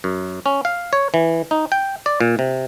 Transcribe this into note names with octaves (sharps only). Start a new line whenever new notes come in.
F#2
C#4
F5
C#5
E3
D#4
G5
D5
A#2
C3